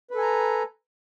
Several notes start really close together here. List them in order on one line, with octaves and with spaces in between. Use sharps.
B4 A4 G#5 A#5